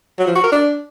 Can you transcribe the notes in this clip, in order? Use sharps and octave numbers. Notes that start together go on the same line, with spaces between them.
F#3
F3
F#4
A#4
D4